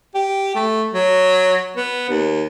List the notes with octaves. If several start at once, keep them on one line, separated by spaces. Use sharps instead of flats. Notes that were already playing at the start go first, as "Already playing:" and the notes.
G4
A3
F#3
B3
D#2